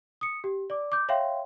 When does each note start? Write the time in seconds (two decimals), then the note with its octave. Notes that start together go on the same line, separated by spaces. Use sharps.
0.21 D#6 C#7
0.44 G4
0.70 D5 D6
0.92 D6 G6
1.09 C#5 E5 F5 G5 C6